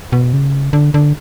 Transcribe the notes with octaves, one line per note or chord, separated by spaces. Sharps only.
B2
C#3
D3
D3